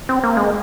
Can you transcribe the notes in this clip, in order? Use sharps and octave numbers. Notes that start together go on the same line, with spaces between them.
C4
A#3
G#3